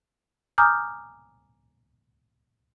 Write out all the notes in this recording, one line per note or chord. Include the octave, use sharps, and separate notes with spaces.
G#5 A#5 D6 D#6 F6 G6